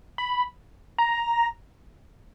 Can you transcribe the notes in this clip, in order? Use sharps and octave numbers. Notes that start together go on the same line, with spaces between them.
B5
A#5